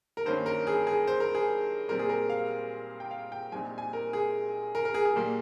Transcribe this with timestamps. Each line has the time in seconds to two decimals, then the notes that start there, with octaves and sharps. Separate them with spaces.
0.17 A#4
0.26 G2 D#3 A#3 C#4 C5
0.46 A#4
0.67 G#4
0.87 G#4
1.07 C5
1.20 A#4
1.35 G#4
1.88 A#2 G3 C4 A#4
1.99 G#4
2.09 A#4
2.30 F5
3.00 G5
3.11 F5
3.32 G5
3.52 A#1 A#2 G3 C4 D#4 G#5
3.78 G#5
3.93 A#4
4.13 G#4
4.75 A#4
4.85 A#4
4.94 G#4
5.05 G#4
5.16 A#2 G3 A#3